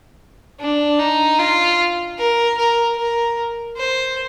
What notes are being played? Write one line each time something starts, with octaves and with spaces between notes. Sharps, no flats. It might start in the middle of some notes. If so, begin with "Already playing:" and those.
D4
D#4
F4
A#4
A#4
A#4
C5